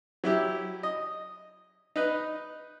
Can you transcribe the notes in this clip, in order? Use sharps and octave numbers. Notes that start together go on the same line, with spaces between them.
F#3 E4 G4
D#5
D#4 B4